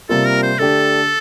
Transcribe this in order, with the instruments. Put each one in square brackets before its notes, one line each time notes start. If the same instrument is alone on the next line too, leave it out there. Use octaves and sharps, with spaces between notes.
[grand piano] C3 G3 A#3 F4 [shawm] A4
[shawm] A#4
C5
[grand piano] D3 A3 D4 G4 [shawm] A4